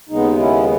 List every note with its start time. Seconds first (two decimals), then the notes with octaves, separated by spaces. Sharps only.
0.09 D#2 C#3 G#3 B3 D#4
0.38 C#4 E4